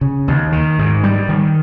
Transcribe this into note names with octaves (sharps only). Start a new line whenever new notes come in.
C#3
D#2
D#3
G#2
G3
D#3